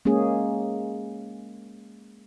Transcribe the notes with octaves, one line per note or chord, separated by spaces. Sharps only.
G#3 A#3 C#4 G#4